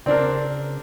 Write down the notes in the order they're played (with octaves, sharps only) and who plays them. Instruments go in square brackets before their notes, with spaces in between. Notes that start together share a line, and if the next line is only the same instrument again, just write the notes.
[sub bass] C#3 [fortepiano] C4 D4 A#4 [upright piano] D5